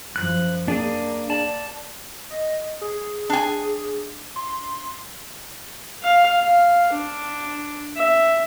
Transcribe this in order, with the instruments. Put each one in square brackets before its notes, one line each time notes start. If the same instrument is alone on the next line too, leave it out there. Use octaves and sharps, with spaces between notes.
[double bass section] F#2 F3 [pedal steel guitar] F#6
[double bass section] A#3 [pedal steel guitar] D4 G#4
[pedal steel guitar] D5 A5
[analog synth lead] D#5
G#4
[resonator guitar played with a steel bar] D4 G#5
[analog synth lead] C6
[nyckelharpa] F5
F5
D4
E5